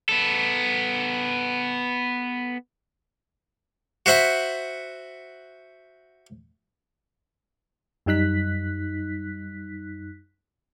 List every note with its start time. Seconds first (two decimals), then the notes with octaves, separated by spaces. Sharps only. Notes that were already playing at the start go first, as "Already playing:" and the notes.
0.09 B3 A4
4.06 F#4 C5 E5 F#5 B5
8.06 F#2 G3 D#4 F#6 B6